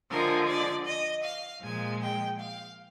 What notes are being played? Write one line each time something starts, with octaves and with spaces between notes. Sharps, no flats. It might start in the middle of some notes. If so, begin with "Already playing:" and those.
D3 F3 G#3 A#4
D5
D#5
F5
A#2 F3 G#3 G#5
G5
F5